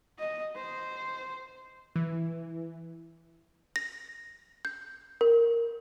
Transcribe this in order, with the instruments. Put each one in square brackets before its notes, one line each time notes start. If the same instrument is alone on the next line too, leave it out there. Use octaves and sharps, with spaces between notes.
[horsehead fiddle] D#5
C5
[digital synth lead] E3
[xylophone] A#6
G6
A#4